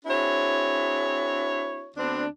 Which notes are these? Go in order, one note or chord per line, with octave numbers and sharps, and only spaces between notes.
C4 D4 E4 F#4 G#4 C#5
D2 B3 C4 D4